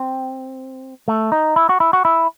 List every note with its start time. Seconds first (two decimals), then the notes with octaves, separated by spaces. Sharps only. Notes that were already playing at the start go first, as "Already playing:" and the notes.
Already playing: C4
1.08 A3
1.32 D#4
1.56 E4
1.69 F#4
1.80 E4
1.93 F#4
2.05 E4